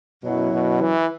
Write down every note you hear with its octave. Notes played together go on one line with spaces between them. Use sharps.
F#2 B2 F#3 E4
B2
E3